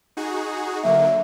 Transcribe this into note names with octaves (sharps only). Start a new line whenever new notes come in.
D#4 F#4 G#4
D3 F#3 A#3 E5